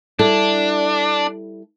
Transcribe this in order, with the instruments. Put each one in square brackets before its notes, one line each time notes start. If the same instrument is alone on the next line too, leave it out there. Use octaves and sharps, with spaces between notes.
[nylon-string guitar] G3 E4 A4 [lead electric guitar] D4